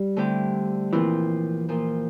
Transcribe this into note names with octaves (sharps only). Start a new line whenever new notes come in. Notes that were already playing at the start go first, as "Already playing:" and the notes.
Already playing: G3
D3 A3 C4 E4 G4
A#2 E3 F3 C4 F4
A#2 F3 A#3 F4